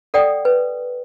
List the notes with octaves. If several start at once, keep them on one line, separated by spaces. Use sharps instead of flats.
A4 D5 F#5 G5 D#6
B4